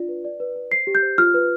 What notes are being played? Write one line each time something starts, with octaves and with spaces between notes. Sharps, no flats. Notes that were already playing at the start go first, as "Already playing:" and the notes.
Already playing: D4 F4 D5
B4
D5
B4
B4
C5 C7
G4
G6
C5
F4 F6
B4